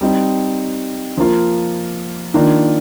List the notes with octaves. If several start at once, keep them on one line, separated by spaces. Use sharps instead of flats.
G3 C4 D#4
F3 A#3 F4
D#3 A#3 D4 F4